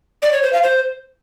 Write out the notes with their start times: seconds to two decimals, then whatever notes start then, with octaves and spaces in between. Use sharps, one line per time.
0.22 D5
0.33 C#5
0.43 C5
0.53 F5
0.63 C5